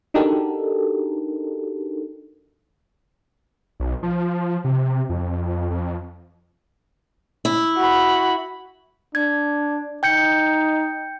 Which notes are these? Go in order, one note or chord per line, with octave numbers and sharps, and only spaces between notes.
D4 D#4 F#4 G4 A4 A#4
B1
F3
C3
F2
F2
E4
F#4 B5
D4 G#6
D#4 G5 G6 C#7